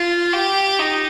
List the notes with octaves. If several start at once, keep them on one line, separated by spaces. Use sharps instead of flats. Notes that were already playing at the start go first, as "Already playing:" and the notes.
Already playing: F4
G4
D#4